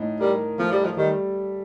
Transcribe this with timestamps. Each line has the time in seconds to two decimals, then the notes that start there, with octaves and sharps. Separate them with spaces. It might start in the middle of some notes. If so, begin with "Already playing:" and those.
Already playing: A2 D#4
0.20 G3 A#4
0.58 F3 A3
0.72 G3
0.84 F3
0.97 D#3 G3